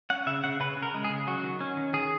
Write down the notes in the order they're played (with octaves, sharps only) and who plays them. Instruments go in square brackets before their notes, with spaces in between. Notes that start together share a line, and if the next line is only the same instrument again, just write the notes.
[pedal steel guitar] C#4 F#5
C#3 E5
C#3 F#5
C#3 B4
C#3
A#4
G#3
G#4
C#3
F#3 F#4
D#3
C#4
D#3
D#3 G#4